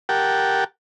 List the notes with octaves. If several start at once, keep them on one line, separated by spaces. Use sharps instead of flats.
G4 A#4 F#5 G5 A5